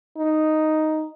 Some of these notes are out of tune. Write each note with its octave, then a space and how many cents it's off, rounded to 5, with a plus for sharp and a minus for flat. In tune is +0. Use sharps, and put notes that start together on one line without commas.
D#4 +0